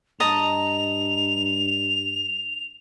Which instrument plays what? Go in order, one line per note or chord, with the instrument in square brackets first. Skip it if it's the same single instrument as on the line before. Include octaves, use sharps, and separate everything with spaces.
[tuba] G2 [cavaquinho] D#5 A5 A#5 [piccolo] F7